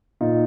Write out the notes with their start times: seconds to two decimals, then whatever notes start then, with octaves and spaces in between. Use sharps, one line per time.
0.21 A#2 D#4 F4